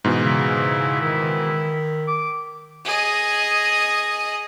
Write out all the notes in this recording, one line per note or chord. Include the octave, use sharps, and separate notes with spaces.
G#2 B2 E3
C#3 E4
D#3 E4
D6
G#4 D#5